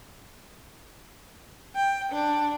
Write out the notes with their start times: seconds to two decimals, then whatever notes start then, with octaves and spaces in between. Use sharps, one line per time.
1.75 G5
2.12 D4